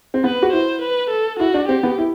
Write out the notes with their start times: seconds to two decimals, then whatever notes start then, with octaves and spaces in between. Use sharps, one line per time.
0.14 C4
0.24 B3 B4
0.42 F#4
0.53 E4 C5
0.82 B4
1.10 A4
1.39 E4 F#4
1.54 D4
1.68 C4 G4
1.83 B3
1.98 E4